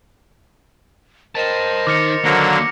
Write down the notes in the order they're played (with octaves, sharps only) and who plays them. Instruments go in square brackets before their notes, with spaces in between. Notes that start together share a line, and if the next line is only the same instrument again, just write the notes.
[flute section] A#4 C5 D#5 [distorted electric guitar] G5 A5 [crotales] A6 E7
[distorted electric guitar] D#3 D#4 [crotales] D6 F6 C#7
[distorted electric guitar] D#2 [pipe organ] D3 F#3 A#3 [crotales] A#6 C#7